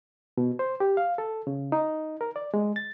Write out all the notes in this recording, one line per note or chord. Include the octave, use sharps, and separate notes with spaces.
B2
C5
G4
F5
A4
C#3
D#4
A#4
D5
G#3
A6